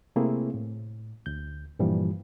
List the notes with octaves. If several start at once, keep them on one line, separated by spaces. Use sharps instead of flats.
C3 A3 A#3 C4 E4 G#4
A2
D2 G6
G2 A#2 E3 F3 G3